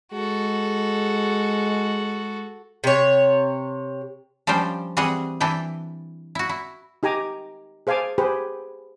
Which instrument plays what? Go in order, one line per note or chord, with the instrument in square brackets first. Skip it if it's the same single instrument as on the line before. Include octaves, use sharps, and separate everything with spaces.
[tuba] G#3 [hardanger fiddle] F#4 A4
[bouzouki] C3 C#5
[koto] F3 G3 C#4 D4 C5 G5
E3 G3 C4 G#4 F#5
E3 D4 E4 G5
E4 F#4
E4
[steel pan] D#4 G4 G#5 A#5 D6
G#4 C5 F5 G#5 A5 D6
G4 G#4 B4 C5